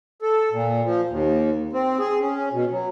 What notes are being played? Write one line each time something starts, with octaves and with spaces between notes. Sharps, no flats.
A4
A#2
F3
D#2
C4
G#4
C#4
B2
F#3